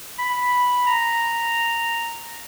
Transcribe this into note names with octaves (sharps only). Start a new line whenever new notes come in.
B5
A#5